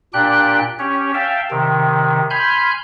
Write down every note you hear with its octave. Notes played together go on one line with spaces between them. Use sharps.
A#2 D4 G4 G5 F#6
C#4 G4 C#5
E5 F5 G5 A5
C3 D#3
G#5 B5 C6 F6 G6